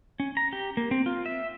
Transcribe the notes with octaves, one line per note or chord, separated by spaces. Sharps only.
C#4
A#5
G4
A#3
C4
F4
E5